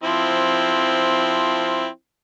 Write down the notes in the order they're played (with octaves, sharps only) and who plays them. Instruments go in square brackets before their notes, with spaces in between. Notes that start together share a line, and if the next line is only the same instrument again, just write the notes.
[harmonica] F3 C4 E4